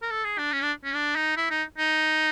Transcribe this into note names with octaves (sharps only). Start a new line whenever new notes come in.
A#4
A4
G#4
D4
C#4
D4
C#4
D4
D#4
E4
D#4
D#4